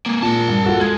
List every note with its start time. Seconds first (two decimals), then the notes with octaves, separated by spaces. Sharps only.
0.06 G#3 A#3
0.22 A#2 A#4 A5
0.49 G2
0.64 F4 F#4 A4
0.81 G#3 G#6